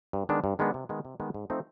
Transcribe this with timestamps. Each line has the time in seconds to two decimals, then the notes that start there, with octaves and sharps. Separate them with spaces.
0.13 G2
0.29 D#3 G#3 B3 D4
0.44 G2
0.59 D#3 G#3 B3 D4
0.74 C3
0.89 D#3 G#3 B3
1.05 C3
1.20 D#3 G#3 B3
1.34 G#2
1.50 F3 A3 C4 D#4